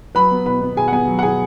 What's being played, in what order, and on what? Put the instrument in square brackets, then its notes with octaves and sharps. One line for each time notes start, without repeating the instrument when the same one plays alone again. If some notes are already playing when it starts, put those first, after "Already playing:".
[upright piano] F#3 B4 B5
B3
B2 B4 B5
B3
B2 G#4 G#5
F#5
B3 G#4 G#5
F#3
F#5
B2 G#4 G#5